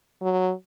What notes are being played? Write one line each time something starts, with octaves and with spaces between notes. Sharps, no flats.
F#3